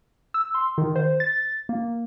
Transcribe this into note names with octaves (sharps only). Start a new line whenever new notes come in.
E6
C6
D#3
C5
A6
A#3